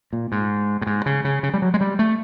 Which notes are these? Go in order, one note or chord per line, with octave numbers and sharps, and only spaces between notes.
A#2
G#2
A2
G#2
C#3
C#3
C#3
G3
F#3
G#3
G3
A3